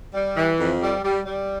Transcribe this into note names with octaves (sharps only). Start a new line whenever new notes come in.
G3
E3
F2
G3
G3
G3